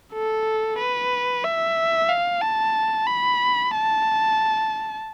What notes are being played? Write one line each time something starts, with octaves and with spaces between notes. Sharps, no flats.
A4
B4
E5
F5
A5
B5
A5